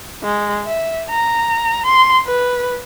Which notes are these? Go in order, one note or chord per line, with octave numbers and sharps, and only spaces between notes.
G#3
E5
A#5
C6
B4